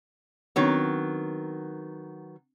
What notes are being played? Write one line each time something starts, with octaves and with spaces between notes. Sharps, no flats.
D#3 F#3 B3 C4 D4 C#5